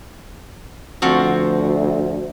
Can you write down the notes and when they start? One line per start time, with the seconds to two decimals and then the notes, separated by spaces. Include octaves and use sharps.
1.02 D2 F3 C4 F#4